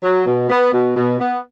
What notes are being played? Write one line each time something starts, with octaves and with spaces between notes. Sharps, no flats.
F#3
B2
B3
B2
B2
B3